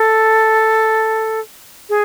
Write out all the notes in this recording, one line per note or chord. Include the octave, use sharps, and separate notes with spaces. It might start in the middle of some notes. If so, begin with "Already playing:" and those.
Already playing: A4
G#4